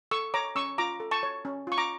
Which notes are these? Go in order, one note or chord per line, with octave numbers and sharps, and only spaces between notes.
A4 C#6 E6
C#5 A#5 D6
C#4 C#6 E6
F4 A#5 D6
A4
A5 C#6
C#5
C#4
F4 C#6
A#5 D6